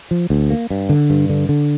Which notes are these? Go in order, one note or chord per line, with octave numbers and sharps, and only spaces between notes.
F3
D2
A#3
G2
D3
G2
D3
D3